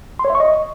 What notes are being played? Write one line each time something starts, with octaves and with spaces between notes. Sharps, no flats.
C6
C#5
E5
C#6
D#5